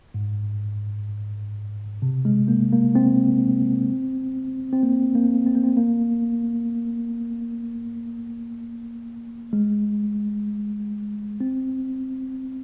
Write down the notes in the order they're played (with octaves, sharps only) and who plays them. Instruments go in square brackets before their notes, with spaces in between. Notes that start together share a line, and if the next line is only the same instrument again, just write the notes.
[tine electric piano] G#2
C3
G#3
A#3
A#3
C4
C4
A#3
A#3
C4
A#3
C4
A#3
G#3
C4